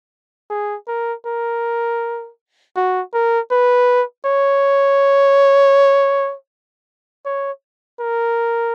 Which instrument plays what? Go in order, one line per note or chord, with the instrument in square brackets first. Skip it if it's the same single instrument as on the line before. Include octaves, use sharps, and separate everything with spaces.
[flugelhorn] G#4
A#4
A#4
F#4
A#4
B4
C#5
C#5
A#4